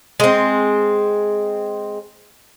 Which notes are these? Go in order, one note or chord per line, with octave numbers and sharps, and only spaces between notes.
G#3 C4